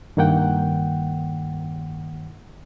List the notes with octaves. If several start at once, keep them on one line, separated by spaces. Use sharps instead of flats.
G2 D#3 A#3 F#5 G5